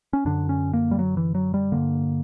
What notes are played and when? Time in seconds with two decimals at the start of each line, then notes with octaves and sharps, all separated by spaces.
0.13 C#4
0.25 F#2 D3 D4
0.49 C#4
0.73 A#3
0.91 G3
0.99 F#3
1.17 E3
1.35 F#3
1.54 G3
1.72 G2 D3 A#3